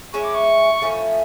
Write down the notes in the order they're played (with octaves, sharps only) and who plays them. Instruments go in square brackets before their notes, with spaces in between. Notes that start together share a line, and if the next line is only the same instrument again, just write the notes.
[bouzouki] G#3 C#4 E4 [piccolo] C#6
[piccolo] D6
C#6
[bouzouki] A2 F3 A3 C#4